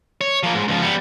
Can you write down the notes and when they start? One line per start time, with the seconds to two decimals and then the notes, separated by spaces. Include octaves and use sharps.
0.21 C#5
0.43 F3 A#3
0.54 G#2
0.68 C#2 F3
0.82 G3 B3